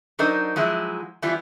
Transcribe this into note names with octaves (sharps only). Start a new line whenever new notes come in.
F#3 D4 D#4 A#4 C5 D#5
F3 F#3 G#3 E4
E3 F3 G3 B3 E4 F4